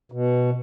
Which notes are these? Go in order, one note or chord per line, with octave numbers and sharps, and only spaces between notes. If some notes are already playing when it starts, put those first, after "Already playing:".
B2